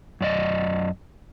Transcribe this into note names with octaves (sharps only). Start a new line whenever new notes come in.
F#2 D5 D#5